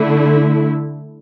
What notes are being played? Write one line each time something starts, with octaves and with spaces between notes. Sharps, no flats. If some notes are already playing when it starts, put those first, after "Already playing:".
Already playing: D3 A3 E4